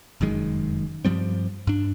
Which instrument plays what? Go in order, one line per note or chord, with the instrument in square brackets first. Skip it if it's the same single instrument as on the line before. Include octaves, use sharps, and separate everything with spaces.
[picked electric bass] F1 F#2 D#3 G#3
G2 F3 G3 C4
G2 D4